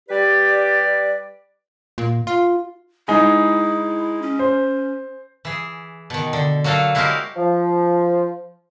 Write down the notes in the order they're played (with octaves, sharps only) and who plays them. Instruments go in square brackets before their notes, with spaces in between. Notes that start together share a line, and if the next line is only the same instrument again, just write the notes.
[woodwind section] G3 G4 B4 D5
[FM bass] A#2
F4
[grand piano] G#3 D#4 G#4 [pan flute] E4
[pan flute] C#4
[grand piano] C5
[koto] E3 G#4
B2 D#3
D3
F#3 A#3 F#4 A4 F5
G#3 E4 F#4 G4 A#4 F5
[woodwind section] F3